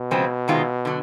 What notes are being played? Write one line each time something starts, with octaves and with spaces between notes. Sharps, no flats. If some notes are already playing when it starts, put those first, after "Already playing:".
Already playing: B2
C#3 F3 G#3 C4
C3 D#3 G#3 C4 F4
D3 F#3